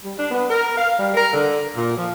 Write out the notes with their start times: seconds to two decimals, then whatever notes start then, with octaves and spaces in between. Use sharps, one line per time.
0.04 G3
0.17 D4
0.31 B3
0.49 A#4
0.76 F5
0.99 G3
1.14 A#4
1.33 D3
1.75 A#2
1.96 F3